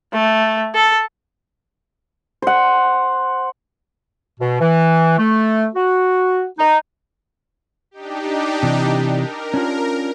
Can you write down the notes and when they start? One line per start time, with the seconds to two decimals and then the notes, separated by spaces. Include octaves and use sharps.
0.14 A3
0.75 A4
2.42 C5 F#5
4.40 B2
4.61 E3
5.18 A3
5.75 F#4
6.59 D#4
7.91 D4 D#4 G4
8.63 C3 E3
9.13 A#4
9.54 C#4 D4 F4